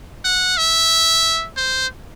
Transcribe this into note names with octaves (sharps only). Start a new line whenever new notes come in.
F#5
E5
C5